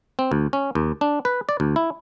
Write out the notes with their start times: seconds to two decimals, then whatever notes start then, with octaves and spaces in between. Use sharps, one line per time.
0.19 C4
0.31 D2
0.53 C#4
0.75 D#2
1.01 D4
1.25 B4
1.49 D5
1.60 D2
1.76 E4